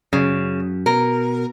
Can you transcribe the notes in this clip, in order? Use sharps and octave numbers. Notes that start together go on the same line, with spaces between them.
F#2 C#3
B2 A#4